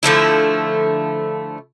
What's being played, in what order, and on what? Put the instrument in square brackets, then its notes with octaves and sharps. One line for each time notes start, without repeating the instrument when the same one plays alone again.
[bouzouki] D3 F3 A3 E4